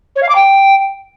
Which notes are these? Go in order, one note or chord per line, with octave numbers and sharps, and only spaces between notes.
C#5
F5
D6
G5